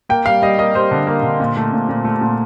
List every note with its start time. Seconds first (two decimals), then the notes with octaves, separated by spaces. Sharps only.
0.09 A#3 G5
0.26 G3 F5
0.42 G3 D#5
0.58 A#3 D#5
0.74 G3 C5
0.91 D3
1.07 A#3
1.23 D3
1.40 A#2
1.57 A3
1.72 A#2
1.89 A#2
2.04 A3
2.21 A#2